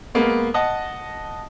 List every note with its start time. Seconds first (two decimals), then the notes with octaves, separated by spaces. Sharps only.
0.15 G#3 A#3 B3
0.54 D#5 F#5 A5